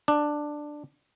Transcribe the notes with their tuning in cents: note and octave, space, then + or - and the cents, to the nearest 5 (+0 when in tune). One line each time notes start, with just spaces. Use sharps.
D4 +10